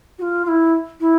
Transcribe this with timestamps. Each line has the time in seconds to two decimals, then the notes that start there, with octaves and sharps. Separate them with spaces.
0.19 F#4
0.22 F4
0.45 F4
0.48 E4
1.00 E4